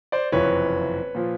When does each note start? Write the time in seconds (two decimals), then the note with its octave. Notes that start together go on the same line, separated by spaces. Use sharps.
0.12 C5 D5
0.32 F#1 F2 C3 E3 B4 C#5
1.15 A#2 F3